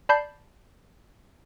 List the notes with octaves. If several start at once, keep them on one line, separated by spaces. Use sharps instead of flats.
D5 A5 B5 G6 C7